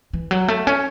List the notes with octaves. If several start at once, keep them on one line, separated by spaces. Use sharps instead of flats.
E3
F#3
A3
C#4